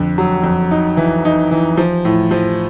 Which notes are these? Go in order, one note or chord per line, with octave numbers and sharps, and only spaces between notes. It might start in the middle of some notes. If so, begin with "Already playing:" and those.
Already playing: F2 D3
F#3
F2
D#4
E3
D#4
E3
F3
A2
F3